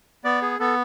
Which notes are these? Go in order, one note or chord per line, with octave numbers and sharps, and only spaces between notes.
B3 D5
G#4
B3 A4